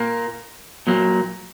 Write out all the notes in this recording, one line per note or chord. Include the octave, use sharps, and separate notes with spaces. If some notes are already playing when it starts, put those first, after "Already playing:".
Already playing: A#2 A#3
A#2 F#3 A#3